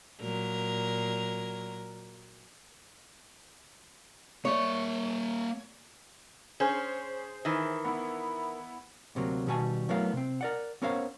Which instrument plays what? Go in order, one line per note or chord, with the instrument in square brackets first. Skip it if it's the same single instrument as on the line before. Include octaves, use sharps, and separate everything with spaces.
[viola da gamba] A#2 F#3 A#4
[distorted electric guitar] A#3 E5 [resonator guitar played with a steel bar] C#5
[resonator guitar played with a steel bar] C#4 [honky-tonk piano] G#4 C5
[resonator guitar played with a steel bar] D#3 E3
[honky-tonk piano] B3 E4
[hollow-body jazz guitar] D2 C3 F#3 A#3
B2 D#3 G3 F#4 G#5 A5
F#3 A3 B3 E4 A#4 F5
C3 C4
A#4 D5 F#5
B3 C#4 A#4 C5 C#5 F5